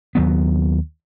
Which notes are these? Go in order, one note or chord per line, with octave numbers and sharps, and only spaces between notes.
D#2 F#3 B3